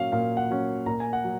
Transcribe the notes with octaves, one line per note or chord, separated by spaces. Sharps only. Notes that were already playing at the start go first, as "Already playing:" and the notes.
Already playing: A#2 F#3 C#4 F5
A#2 F5
F#5
F#3 C#4
A#2 A#5
G#5
F#5
F#3